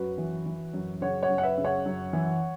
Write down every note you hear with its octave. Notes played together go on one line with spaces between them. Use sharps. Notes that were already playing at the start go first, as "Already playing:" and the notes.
Already playing: F#2 F#4 B4
E3
E3
F#2
C#3 C#5 F#5
C#5 F#5
F#2
F#5
B4 E5
C#3
C#5 F#5
F#2
E3